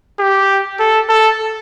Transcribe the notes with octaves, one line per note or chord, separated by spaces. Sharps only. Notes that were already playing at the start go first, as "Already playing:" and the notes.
G4
A4
A4